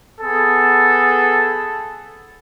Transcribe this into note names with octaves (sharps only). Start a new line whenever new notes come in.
B3 G#4 A4